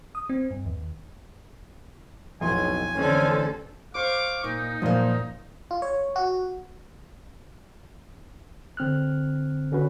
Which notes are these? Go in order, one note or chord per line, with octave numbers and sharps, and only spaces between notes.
D#6
C4
G2
D#2
B1 F2 A2 G#5 C6
A1 D3 C4 C#4 A4
C5 F5 C#6 D6
A#2 D#4
F#2 A#2 F3 A#3
F4
C#5
F#4
D3 C4 F6 F#6
D3 C#4 F#4 B4